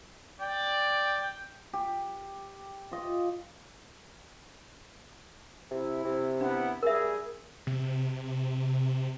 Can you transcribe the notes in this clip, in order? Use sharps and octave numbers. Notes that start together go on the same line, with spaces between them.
D5 G5
G4
F4 D#5
C3 E4
C3
B3 D4 E4 F#5
G3 G#4 A#4 E5
C3